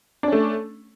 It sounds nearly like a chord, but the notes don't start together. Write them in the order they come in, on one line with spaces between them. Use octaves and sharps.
D4 C#4 A3